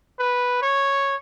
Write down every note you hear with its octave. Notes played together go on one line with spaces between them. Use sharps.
B4
C#5